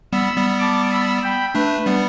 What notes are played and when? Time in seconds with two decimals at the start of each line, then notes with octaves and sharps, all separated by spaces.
0.13 G3 B3 B5 E6
0.36 G3 B3
0.59 A5 D6
0.91 B5 E6
1.23 G5 B5
1.55 A3 D4 B4
1.86 G3 B3